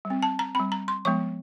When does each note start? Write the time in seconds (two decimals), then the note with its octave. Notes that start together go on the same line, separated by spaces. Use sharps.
0.05 G3
0.10 C4
0.23 A5
0.39 A#5
0.55 G3 C4 B5
0.72 A#5
0.88 C6
1.05 F3 G#3 B3 C#6